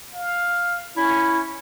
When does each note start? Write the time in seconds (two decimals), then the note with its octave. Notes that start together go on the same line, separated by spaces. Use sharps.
0.14 F5
0.97 C#4 E4